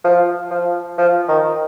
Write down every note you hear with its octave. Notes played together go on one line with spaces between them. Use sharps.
F3
F3
F3
D#3